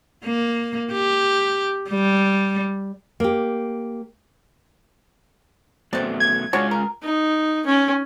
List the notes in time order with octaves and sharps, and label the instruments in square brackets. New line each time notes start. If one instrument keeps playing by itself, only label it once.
[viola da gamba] A#3
G4
G3
[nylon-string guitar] A#3 G4
[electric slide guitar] F#3 A3 B3 [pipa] C4 D5
[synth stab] G#6
[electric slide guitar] G#3 F4 G#5 [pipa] D4 F#4 C#5
[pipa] A#4
[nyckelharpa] D#4
C#4